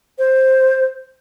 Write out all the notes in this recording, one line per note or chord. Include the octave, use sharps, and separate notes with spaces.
C5